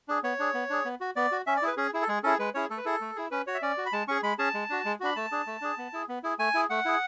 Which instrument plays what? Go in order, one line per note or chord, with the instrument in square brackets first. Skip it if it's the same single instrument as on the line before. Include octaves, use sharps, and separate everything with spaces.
[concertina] D4 G#4
B3 C#5
D4 G#4
B3
D4 G#4
B3
F#4
B3 D5
F#4
C#4 E5
D5
E4 G#4 B4
C#4 G#4
E4 G#4
A4
G#3 G#4
C#4 E4 G#4 A4
G#3 B4
C#4 E4 G#4 C#5
A3 A4
B4
E4 G#4 A4
A3
E4 G#4
C#4 B4
F#4 C#5
E5
C#4 D5
F#4
B5
G#3 A5
C#4 G#4 C#6
G#3 B5
C#4 G#4 A5
G#3
D4 F#4
G#3
D4 F#4 B5
A3 A5
D4 G#4
A3
D4 G#4
B3
E4 G#4
B3
E4 G#4
A3 G#5
E4 G#4
A3 F#5
E4 G#4